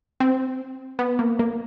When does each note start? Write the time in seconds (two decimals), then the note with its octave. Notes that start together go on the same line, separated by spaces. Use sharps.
0.20 C4
0.99 B3
1.19 A#3
1.39 A#3